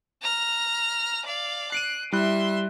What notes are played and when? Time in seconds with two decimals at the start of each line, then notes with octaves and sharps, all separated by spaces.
0.22 A#5 F6
1.26 D5 F5
1.72 F#6 C7 D7 D#7
2.12 G3 E4 E5 C6 F#6